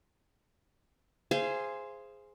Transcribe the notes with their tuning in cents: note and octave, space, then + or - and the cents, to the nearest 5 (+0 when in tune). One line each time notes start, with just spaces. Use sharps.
G#4 +0 C5 +0 F5 -35